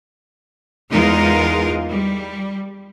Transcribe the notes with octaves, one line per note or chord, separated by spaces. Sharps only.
E2 G#3 D#4 F4 A#4
G3